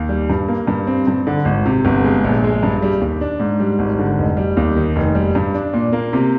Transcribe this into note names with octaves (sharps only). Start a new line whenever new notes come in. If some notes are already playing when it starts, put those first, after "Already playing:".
Already playing: D#2
G3
G2
A#3
G2
C4
G2
D3
G#1
C3
G1
G#3
A#1
G#3
G2
G3
D#2
D4
G#2
G3
G#1
D3
F1
G3
D#2
D#3
F1
G3
G2
D4
A#2
A#3
C3